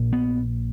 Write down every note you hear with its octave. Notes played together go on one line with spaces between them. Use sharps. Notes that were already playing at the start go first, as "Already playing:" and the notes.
Already playing: A#1 A#2
B3